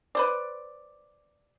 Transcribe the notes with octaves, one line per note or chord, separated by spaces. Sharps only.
B4 C5 D5